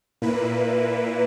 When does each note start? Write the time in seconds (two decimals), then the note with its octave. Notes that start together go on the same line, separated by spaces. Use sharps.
0.22 A#2 A#3 E4 B4